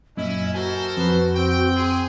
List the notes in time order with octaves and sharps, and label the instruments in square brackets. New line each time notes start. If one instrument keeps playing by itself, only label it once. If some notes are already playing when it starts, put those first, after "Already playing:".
[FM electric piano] F#2 A#2 [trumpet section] C#4 E4 [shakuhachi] D#5
[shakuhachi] F#4 [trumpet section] A4 A#4 C5 [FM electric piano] G#5
[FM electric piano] F2 [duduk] B4
[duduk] C4 [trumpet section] G5
[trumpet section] G#4 [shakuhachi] C6